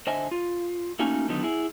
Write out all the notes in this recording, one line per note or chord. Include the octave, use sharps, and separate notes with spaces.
D3 C5 D#5 E5 G#5
F4
A3 A#3 C#4 D#4 F#4 G#5
D3 D#3 F#3 B3 D#4
E4 G#4